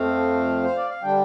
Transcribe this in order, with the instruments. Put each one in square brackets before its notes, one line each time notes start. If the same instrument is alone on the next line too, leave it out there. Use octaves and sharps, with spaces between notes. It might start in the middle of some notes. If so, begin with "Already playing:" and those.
Already playing: [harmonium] F2 F3 A3 C4 F5
C5
D5
F5
D3 G3 D4 G5